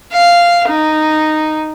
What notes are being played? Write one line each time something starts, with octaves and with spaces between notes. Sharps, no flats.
F5
D#4